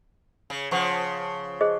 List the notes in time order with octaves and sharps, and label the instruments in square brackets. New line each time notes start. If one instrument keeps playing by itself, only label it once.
[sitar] C#3
[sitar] C#3 F3 [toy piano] C5 F#5 C#6
[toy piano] G#4 C5 D#5